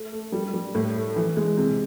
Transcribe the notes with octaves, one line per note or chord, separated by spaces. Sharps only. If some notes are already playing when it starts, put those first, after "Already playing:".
Already playing: A3
A3
G3
G3
A2
A3
E3
G#3
C3